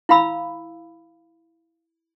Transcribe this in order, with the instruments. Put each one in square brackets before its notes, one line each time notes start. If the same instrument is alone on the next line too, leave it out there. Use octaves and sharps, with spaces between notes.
[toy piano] E4 F5 B5 E6